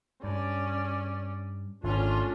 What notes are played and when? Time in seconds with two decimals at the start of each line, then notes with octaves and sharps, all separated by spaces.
0.24 G2 C#4 D5
1.83 G#1 D3 A3 C#4 D4 F4